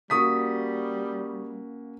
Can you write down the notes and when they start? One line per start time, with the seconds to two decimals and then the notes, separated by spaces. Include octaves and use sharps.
0.10 C#3 G3 A#3 F#4 C#6 D#6 B6